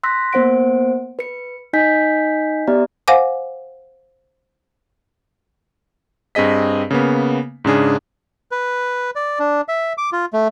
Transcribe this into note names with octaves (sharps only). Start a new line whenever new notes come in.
C6 E6 F#6 A#6 B6
A#3 B3 C5 F#5 D7
B4 C#7
D#4 D#5 G#5 G6 B6
B3 G4 D5 E5 A#5
C5 F5 F#5 G#5 D6
G2 C4 G#4 D#5 B6
C#3 A#3 B3
G#2 C#3 D4 G#4
B4
D5
D4
E5
D6
F4
A3